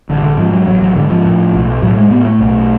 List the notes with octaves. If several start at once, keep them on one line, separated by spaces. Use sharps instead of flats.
A1 D3
D3
G#2 F3
F#3
A1 F#3
F#3
G#2 D3
F3
A2
B1
A2 F#3
G#3
A2 B3
A3
B1